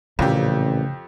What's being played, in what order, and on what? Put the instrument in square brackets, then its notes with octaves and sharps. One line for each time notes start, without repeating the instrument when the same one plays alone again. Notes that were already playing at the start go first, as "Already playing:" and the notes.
[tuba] A1 [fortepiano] F2 G4 [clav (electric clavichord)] A#2 A#3 C4 [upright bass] C#3